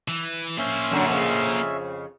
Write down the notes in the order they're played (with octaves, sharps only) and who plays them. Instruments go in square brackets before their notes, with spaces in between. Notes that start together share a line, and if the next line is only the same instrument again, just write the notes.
[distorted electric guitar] E3
[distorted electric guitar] A#3 C5 [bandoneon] C#4 E5
[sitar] F#2 D3
F2 C#3